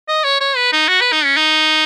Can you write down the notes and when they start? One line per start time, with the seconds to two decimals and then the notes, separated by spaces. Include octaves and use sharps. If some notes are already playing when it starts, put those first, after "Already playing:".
0.09 D#5
0.24 C#5
0.40 C#5
0.56 B4
0.73 D#4
0.88 F#4
1.01 B4
1.12 D#4
1.24 C#4
1.36 D#4